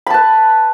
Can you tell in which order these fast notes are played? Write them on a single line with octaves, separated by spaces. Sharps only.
B5 A5 B4